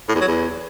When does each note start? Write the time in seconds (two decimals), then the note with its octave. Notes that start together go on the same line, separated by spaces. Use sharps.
0.08 A2
0.15 E2
0.21 F#3
0.28 E2